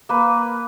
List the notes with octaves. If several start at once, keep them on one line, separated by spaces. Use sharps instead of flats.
A#3 B4